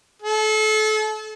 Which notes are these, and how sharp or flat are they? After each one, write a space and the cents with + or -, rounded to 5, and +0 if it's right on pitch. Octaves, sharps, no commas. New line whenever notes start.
A4 -30